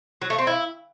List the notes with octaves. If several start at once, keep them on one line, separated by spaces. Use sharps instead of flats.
F#3
A3
C4
E4